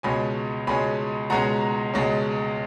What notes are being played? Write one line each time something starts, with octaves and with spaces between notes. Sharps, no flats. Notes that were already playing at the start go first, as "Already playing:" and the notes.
C#2 B2 G#3 C#4 G#5 B5
C#2 B2 G#3 C#4 G#5 B5
C#2 B2 G#3 C#4 F#5 A#5
C#2 B2 G#3 C#4